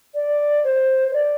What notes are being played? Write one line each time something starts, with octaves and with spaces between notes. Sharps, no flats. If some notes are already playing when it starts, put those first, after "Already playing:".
D5
C5
C5
D5